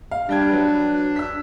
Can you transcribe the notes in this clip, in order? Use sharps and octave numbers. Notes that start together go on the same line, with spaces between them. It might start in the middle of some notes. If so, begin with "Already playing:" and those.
F5
G3 D4 G5 G#6
F#3 B4
E6 B6